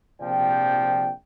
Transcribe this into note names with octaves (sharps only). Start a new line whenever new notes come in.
A#1 C3 F3 D5 G5